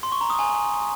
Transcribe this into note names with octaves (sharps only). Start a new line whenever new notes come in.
C6
C#6
A#5
D#6
G#5